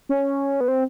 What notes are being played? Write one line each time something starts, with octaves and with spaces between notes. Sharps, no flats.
C#4
B3
C4